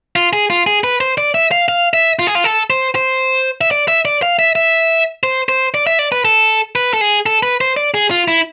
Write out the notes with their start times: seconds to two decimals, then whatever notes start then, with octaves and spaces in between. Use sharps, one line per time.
0.16 F4
0.33 G#4
0.50 F4
0.67 G#4
0.84 B4
1.00 C5
1.18 D5
1.34 E5
1.51 F5
1.68 F5
1.94 E5
2.19 F4
2.27 G#4
2.35 F4
2.44 A4
2.70 C5
2.95 C5
3.61 E5
3.71 D5
3.88 E5
4.05 D5
4.22 F5
4.39 E5
4.55 E5
5.23 C5
5.49 C5
5.74 D5
5.87 E5
5.99 D5
6.12 B4
6.25 A4
6.75 B4
6.94 A4
7.01 G#4
7.26 A4
7.43 B4
7.61 C5
7.77 D5
7.94 G#4
8.11 F4
8.28 E4